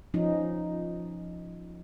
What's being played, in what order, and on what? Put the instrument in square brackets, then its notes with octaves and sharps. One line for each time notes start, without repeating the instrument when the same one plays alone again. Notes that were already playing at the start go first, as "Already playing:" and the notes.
[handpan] F3 C#4 D#4